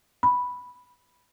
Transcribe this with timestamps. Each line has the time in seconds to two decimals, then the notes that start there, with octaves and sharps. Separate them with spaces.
0.23 B5